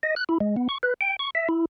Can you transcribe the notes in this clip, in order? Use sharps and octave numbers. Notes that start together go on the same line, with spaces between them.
D#5
F#6
E4
G#3
B3
C#6
B4
G5
C#6
E5
E4